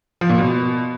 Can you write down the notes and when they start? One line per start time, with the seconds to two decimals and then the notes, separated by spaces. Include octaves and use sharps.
0.21 F3
0.30 A#2
0.38 B2